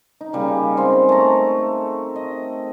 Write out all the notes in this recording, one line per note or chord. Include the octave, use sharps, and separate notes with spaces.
D#4
C#3 G3 A#3
G#3 C4 C5
A3 A#5
D#5